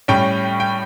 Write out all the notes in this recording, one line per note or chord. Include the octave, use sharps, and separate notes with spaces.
A2 G3 C#4 G5
G5